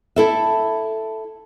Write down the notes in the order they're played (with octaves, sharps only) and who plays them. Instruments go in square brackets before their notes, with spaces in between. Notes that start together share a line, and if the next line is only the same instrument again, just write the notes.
[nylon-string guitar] E4 A4 E5